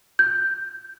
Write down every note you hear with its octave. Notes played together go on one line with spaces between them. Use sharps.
G6